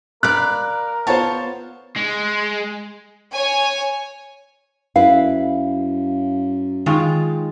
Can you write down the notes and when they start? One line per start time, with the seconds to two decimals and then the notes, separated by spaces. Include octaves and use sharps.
0.23 A#4 D5 F5 B5 F#6
1.07 B3 F4 C5 C#5 F5 A5
1.96 G#3
3.35 C#5 G#5
4.96 F#2 E4 B4 F5
6.86 D#3 G#3 F4